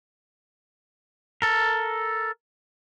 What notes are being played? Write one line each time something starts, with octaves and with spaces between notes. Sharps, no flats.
A4 A#4